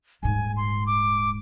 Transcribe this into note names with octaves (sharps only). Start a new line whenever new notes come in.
D#1 G#2 G#5
C6
D6